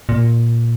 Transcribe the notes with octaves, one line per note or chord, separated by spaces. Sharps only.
A#2